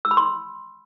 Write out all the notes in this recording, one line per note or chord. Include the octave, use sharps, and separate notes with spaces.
E6
B5
C6